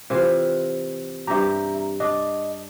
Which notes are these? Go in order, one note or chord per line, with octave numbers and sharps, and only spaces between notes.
C3 E3 F4
G2 G4 E5 A#5
D4 D#5